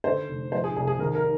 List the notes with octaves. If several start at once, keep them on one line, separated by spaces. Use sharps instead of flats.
D3 C5
F1
F3 C5
G#4
C2 G#4
G#4
D#3 A#4
A#4